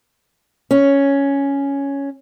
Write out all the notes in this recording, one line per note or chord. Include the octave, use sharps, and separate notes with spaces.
C#4